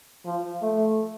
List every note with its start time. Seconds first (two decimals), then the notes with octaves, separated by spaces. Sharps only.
0.26 F3
0.62 A3